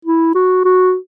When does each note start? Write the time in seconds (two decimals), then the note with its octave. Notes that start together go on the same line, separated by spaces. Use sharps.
0.05 E4
0.35 F#4
0.65 F#4